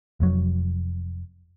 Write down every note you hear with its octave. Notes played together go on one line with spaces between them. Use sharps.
F1 F2 F#3